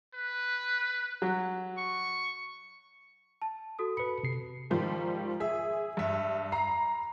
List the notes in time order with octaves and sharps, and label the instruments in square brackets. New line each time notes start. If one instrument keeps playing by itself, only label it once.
[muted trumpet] B4
[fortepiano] F#3
[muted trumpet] C#6
[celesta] A5
F#4 A4 D#6
[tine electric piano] B4 B5 [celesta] C#7
[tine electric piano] C3 C7
[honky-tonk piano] G#2 D#3 F3 G3
G#4 E5
G2 E5
A#5 B5 C7